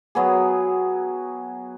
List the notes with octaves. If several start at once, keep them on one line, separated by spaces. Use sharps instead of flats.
F#3 B3 G#4